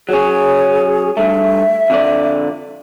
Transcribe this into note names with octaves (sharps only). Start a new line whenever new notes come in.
F#3 C#4 G#4
G2 A3 E5
F2 D3 D5